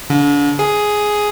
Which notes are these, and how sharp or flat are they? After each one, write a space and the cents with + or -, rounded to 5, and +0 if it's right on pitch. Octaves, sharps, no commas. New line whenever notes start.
D3 -35
G#4 +5